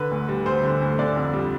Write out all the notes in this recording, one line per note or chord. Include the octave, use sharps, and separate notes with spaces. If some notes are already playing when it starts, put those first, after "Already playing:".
Already playing: D3 B4
D2
G3
D2 C5
D3
D2
D3 D5
F2
G3